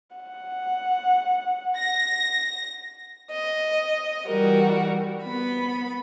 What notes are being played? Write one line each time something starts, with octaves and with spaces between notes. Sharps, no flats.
F#5
A#6
D#5
E3 G3 F#4 A#4
B3 B5